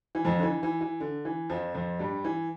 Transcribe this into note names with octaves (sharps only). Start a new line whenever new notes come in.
E3
F2 F3
D3
E3
E3
E3
D3
E3
F2 F3
F2 F3
G2 G3
E3